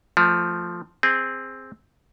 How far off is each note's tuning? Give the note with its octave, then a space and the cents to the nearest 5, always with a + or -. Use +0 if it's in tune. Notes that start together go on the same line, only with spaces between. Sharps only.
F3 +0 A3 +25
C4 +0 G#4 -15